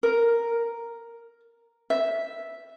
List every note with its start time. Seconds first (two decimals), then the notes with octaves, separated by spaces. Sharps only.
0.03 A#4
1.90 E5